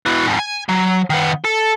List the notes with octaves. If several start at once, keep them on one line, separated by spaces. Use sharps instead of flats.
B2 E3
F2 G#2
G#5
F#3
D#3 B3
A4